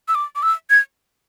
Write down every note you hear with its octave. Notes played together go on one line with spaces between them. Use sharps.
E6
D6
D6
E6
G#6